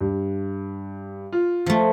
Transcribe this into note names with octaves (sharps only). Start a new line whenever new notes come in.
G2
F4
F3 A3